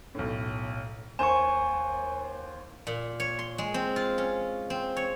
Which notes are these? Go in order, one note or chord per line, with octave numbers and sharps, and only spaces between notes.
B1 A2
D#2 C5 G#5 C#6 E7
A#2
C#5
C6
G#3
C4
F4
C#4
C4
C#5